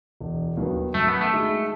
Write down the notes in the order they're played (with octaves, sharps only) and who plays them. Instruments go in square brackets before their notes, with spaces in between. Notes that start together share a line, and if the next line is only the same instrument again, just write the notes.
[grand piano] E1
D#2 D#3 F#3 B3
[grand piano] F#2 [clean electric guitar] A3
[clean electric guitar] B3
A3
[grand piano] D#3 G#3 D#4 F#4